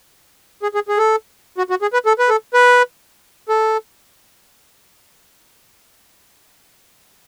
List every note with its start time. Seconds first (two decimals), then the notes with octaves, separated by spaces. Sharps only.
0.63 G#4
0.75 G#4
0.88 G#4
0.98 A4
1.58 F#4
1.70 F#4
1.82 G#4
1.93 B4
2.06 A4
2.19 B4
2.29 A4
2.54 B4
3.49 A4